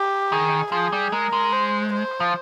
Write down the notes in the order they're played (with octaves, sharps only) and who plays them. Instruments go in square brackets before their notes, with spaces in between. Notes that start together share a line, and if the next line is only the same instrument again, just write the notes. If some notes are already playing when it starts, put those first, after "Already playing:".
Already playing: [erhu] G4
[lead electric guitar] D#3 [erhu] G#4
[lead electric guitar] F3 [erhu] G#4
[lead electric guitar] G3
[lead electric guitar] G#3 [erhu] A#4
[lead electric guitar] G#3
[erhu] C5
C5
[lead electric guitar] F3